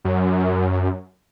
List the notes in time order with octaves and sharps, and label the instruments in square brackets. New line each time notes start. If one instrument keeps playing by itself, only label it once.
[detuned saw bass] F#2